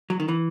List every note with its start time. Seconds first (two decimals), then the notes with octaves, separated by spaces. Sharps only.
0.10 F#3
0.20 D#3
0.28 E3